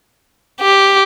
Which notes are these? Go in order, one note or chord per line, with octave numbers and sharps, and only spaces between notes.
G4